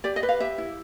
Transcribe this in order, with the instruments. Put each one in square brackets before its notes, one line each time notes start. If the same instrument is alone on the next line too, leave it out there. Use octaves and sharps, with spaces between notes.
[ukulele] G4 D5
D#5
B4
F5
G4 E5
E4